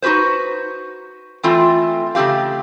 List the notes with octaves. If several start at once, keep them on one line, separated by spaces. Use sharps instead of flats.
D#4 F#4 G4 B4 C5
E3 A3 C4 F4
C#3 A3 C4 G4 F5